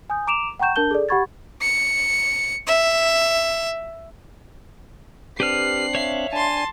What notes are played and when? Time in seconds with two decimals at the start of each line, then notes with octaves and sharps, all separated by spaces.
0.10 G#5 D#6 G6
0.27 A#5 D6 D7 E7 F7
0.60 F#5 G5 A#5 C#6 G6 E7
0.76 D4 A#4 A5 G6 G7
0.91 G#4 A4 D5
1.09 G4 F#5 B5 C#6 G#6 A6
1.62 C#7
2.67 E5
5.40 C4 D4 G4 B4 F6 F#6 C7
5.95 C#5 E5 F5
6.33 D4 G#5 A5 C6